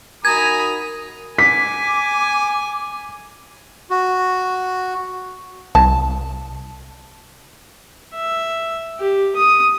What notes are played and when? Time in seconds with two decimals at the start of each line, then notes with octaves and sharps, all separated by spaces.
0.25 D#4 F#4 A#4 G#5 A#5 B5 D#6 G#6
1.38 G#5 D6 B6
3.90 F#4
5.75 C2 A5
8.15 E5
8.99 G4
9.36 D#6